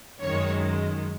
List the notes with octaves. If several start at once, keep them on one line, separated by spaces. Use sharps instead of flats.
F#2 D#3 G#3 C#5